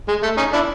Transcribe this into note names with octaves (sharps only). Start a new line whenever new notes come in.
G#3
A3
C#4 D#4
D4 E4